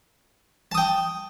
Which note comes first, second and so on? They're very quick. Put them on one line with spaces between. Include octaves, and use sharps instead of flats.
A5 D#6 G5